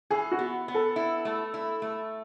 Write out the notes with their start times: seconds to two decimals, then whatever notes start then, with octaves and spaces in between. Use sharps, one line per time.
0.10 E3 G#4
0.32 F#4
0.39 B3
0.68 B3
0.74 A4
0.96 E4
1.25 A3
1.54 E4
1.82 A3